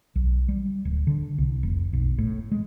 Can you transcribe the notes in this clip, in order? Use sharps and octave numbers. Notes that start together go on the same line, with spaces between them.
B1
G3
D1
D3
C2
F1
B1
A2
G#3